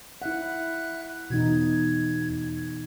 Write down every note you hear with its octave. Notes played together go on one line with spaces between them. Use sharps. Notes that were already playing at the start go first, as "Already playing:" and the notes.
E4 E5 F#5 F#6
E2 B2 E3 D#4 G#6